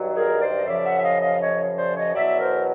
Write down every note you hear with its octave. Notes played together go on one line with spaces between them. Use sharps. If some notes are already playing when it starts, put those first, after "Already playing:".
Already playing: G2 D#3 F#3
G#4 A#4
C5 D5
D#5
F#2 C#3 F3 D5 E5
E5 F#5
E5
D#5 F5
D#5 F5
C#5 D#5
C5 D5
C#5 D#5
E2 B2 F#3 D5 E5
A#4 C5